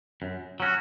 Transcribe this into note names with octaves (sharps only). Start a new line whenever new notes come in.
F#2
F#3 C#4 F#4